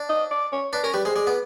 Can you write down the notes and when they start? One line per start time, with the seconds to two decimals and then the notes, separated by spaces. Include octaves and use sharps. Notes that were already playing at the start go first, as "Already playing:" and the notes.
Already playing: D4
0.09 D#5
0.31 D5
0.52 C#5
0.73 D4 B4
0.83 C#4 A#4
0.94 G3 B4
1.05 G#3 C5
1.16 G#3 D5
1.27 B3